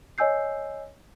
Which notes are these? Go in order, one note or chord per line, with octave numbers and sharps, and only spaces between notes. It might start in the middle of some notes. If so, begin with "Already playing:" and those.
C#5 D#5 G#5 E6 G6 C7